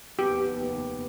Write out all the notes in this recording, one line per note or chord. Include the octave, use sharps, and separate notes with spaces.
F1 D#2 B3 G4